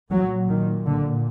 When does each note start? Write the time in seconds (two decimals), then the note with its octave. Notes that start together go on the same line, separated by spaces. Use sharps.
0.10 A#2 F#3
0.48 D#3
0.86 D3